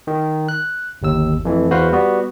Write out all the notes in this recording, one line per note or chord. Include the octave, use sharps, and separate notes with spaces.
D#3
F#6
G1 D#2 E6
F2 E3 A3
E2 F#4 B4 C5 F5
G3 B3 F#4